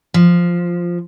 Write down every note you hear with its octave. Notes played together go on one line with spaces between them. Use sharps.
F3